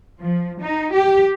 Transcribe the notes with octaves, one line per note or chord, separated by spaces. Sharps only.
F3
D#4
G4